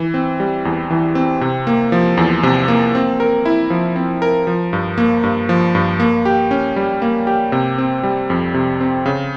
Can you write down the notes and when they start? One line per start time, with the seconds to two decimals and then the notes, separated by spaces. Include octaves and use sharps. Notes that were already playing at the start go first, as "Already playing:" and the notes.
Already playing: E3
0.14 C4
0.40 G3
0.65 E2
0.90 E3
1.15 C4
1.41 C3
1.67 A#3
1.92 F3
2.18 E2
2.43 C3
2.68 A#3
2.95 C4
3.20 A#4
3.45 E4
3.70 F3
3.96 C4
4.22 A#4
4.47 F3
4.73 G2
4.98 A#3
5.23 G2
5.49 F3
5.75 G2
6.00 A#3
6.25 G4
6.51 C#4
6.76 G3
7.02 A#3
7.27 G4
7.52 C3
7.78 C4
8.03 G3
8.30 F2
8.54 C3
8.81 C4
9.06 C#3